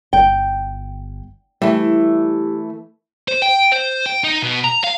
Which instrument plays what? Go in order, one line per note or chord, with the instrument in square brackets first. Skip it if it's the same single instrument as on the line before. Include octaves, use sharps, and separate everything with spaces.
[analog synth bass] G1 [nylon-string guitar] G5
[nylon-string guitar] E3 A3 [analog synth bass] G3
[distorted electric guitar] C5
G5
C5
G5
D#4
B2
A#5
F5